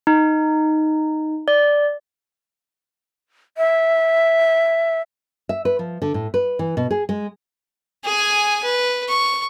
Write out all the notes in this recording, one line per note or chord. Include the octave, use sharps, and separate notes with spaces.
D#4
D5
E5
E5
B4
F3
D3
A2
B4
E3
B2
G#4
G#3
G#4 G#5
B4
C#6